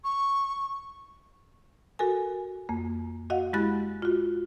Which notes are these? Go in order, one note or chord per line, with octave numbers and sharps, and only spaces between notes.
C#6
F#4 A4 A#4 G#5
F2 A#3
F#4 D#5 F5 F#5
G#3 E4 G4 B5 F#6 A6
F4 F#4